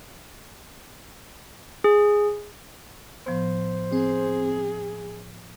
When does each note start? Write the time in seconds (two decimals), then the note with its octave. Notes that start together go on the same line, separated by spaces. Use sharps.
1.84 G#4
3.27 A2 F3 B3 C5
3.92 C4 G#4